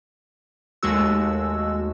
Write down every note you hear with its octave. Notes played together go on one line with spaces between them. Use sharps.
D#2 G#3 A3 F#4 E6